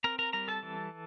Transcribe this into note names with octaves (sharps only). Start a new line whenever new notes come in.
C4 A#4 A#5
A#4 A#5
G3 A#4 A#5
A4 A5
E3